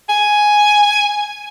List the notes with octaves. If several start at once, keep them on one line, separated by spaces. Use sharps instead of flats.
G#5